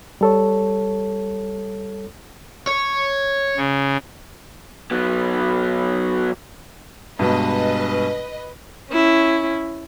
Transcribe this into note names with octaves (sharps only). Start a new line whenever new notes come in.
G3 A4 C#5
C#5
C#3
F#3 B3
G2 B2 G#3 B4 D#5
C#4 E4